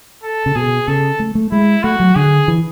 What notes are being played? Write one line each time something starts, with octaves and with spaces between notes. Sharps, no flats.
A4
C#3
B2 G#4
C#3 A4
A3
A3
G#3 E4
A3 F#4
F#3
D3 G#4
E3